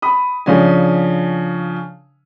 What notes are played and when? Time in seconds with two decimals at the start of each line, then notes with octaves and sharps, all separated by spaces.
0.02 B5 D#6
0.46 C#3 F3 C#4 D4 G#5